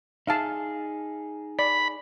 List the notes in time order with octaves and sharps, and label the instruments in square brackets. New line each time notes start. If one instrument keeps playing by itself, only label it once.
[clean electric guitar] D#4 G#4 [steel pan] E5 F5 A5
[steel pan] D5 [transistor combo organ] B5